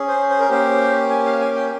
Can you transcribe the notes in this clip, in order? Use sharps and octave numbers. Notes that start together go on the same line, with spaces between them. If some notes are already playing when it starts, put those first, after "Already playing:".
Already playing: C#4 G#4
C5
C5
A#4
A#3 C#4 G4 C5
G#5
F5
G#5
G5